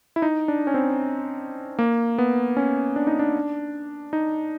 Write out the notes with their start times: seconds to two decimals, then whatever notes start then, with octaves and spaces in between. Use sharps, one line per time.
0.16 E4
0.22 D#4
0.48 D4
0.67 C#4
0.74 C4
1.79 A#3
2.18 B3
2.57 C#4
2.96 D4
3.07 D#4
3.19 D4
4.13 D#4